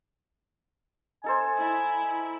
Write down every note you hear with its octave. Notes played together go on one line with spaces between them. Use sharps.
D#4 A4 C5 G#5
E4